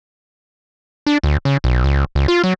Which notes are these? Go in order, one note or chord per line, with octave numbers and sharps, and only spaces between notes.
D4
D2
C#3
B1
C#2
C#2
F4
F#3